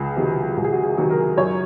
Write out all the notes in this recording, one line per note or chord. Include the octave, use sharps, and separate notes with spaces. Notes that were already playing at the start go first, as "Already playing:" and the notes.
Already playing: C#2 G#4
C3 D#3 F#3
C#2 F#4
G#4
F#4
G#4
C3 D#3 F#3
A#4
F#2 C#5